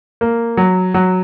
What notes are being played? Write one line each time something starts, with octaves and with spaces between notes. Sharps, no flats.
A#3
F#3
F#3